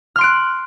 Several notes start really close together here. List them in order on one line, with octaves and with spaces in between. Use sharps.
F6 C6 D7 F#6